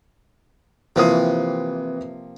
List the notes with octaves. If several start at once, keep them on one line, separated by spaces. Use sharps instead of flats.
C3 E3 F3 A#3 C4 B4 D#6